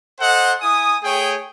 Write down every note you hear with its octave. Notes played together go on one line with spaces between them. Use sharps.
A4 C5 D#5 F#5
E4 G#5 D#6
A3 G#4 C#5 G5 D#6